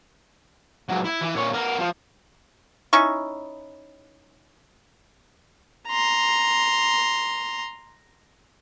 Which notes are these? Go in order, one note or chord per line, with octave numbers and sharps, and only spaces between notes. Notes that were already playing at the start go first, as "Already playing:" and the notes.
C#2 F#3
E4
E3
A#2 C#5
B3 A#4
F3
C#4 D#4 E4 C#6
A#5 C6